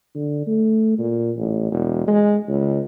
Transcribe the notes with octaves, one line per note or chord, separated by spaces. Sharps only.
D3
A3
A#2
A1
E1
G#3
C#2